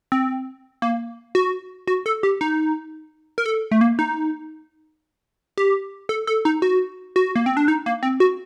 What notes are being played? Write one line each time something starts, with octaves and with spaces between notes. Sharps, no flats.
C4
A#3
F#4
F#4
A4
G4
D#4
A#4
A4
A3
A#3
D#4
G4
A4
A4
D#4
F#4
F#4
A#3
C4
D4
D#4
A#3
C4
F#4